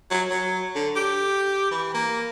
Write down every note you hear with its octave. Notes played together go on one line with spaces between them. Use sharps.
F#3
F#3
D3
G4
E3
A#3